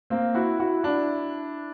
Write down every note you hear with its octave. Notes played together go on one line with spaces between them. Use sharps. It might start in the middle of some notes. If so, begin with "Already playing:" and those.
A#3 C4
E4 F#4
E4 F#4
D4 E4